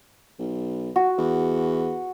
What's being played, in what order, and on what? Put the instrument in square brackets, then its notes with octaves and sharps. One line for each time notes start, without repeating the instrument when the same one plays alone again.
[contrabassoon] B1
[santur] F#4
[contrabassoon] E2